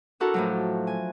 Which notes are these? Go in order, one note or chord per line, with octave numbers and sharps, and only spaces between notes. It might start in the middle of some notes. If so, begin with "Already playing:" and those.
D4 E4 F#4 A4 A#4
A2 F3 F#3
G#5